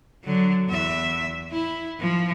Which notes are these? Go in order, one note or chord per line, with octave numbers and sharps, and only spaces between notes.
D3 F#3
E2 E5
E4
F3